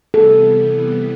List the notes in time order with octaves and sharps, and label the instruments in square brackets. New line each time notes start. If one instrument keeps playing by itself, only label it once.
[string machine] C3 E3 G3 B3 [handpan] A4